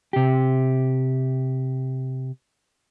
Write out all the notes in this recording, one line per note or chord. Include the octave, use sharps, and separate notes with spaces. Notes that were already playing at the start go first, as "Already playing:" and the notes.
C3 G4